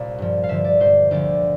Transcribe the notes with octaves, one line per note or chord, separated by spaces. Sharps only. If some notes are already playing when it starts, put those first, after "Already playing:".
Already playing: C2 A#2 F5
G2 F3
F5
G2 D3 F3 E5
D5
G2 F3 C5
D2 D3 F3 D5